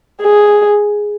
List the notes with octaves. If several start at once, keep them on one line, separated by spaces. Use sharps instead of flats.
G#4